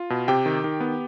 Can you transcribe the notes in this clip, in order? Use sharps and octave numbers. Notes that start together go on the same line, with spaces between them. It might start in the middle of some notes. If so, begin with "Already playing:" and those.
Already playing: F4
B2
C3 G4 G5
D#3
D#3
B3